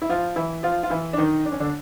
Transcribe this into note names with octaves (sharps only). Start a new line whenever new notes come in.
E4
F3 F4
E3 E4
F3 F4
F4
E3 E4
D4
D#3 D#4
D4
C#4
D3 D4